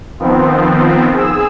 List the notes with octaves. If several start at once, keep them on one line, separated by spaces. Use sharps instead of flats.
D#3 F3 B3 C4
G#4 E6